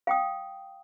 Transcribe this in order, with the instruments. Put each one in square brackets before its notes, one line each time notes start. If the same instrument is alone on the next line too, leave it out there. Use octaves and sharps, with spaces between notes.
[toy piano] F5 G5 D#6